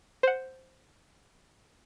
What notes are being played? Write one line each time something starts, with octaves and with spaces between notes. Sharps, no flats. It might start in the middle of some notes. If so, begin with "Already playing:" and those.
C5 F#5